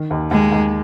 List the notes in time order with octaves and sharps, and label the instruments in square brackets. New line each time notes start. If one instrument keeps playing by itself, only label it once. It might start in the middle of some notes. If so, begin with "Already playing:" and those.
Already playing: [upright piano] D#3
D#2
[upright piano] D#2 [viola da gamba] G#3
[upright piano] D#2